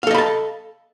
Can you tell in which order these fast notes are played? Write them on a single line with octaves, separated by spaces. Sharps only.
F5 A4 D#5 B5 A5